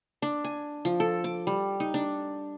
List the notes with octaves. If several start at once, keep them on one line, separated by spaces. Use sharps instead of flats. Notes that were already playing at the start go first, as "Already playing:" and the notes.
D4
G#5
F3
A4
D6
G3
D#4
D4